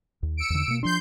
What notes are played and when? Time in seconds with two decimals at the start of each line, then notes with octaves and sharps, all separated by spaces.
0.23 D#2
0.37 E6 C#7 D7
0.50 E2 D3
0.68 B2 A#3
0.83 F3 D4 C6 G6